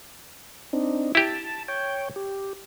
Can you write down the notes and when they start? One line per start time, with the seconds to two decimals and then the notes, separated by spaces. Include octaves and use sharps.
0.73 C4 D4 D#4
1.15 E4 G4 A5
1.68 C#5 G5
2.16 G4